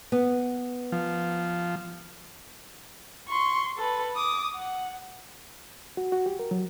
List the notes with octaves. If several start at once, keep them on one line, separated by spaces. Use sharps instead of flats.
B3
F3
C6 C#6
A4 B4
D6 D#6
F#5
F#4
F#4
G4
A#4
F#3